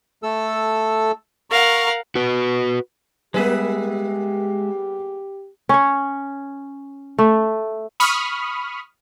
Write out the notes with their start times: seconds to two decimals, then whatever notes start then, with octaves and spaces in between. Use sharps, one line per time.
0.23 A3 A4 E6
1.50 A#4 F5 F#5 A#5 C#6
2.15 F#4 B4
3.34 G3 G#3 A#3 B3 G4 G#4 B4 E5
5.69 C#4 C#5
7.18 A3
8.00 B5 C#6 D#6 F6